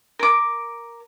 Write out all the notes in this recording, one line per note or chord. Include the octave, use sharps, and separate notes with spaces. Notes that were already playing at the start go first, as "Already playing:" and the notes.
A#4 D6